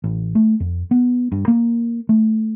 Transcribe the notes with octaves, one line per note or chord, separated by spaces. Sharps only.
A1
A3
F2
B3
G2
A#3
A3